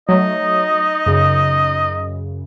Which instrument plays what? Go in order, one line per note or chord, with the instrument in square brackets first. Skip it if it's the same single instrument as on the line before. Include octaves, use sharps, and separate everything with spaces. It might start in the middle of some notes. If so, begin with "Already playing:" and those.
[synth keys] F#3 A3 [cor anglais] D#4 [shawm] D#5
[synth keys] F#2 C#3